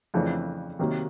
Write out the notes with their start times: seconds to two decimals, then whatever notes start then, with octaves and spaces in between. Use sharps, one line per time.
0.14 F2 C#3 E3 A3 D4
0.79 C3 D#3 F#3 A#3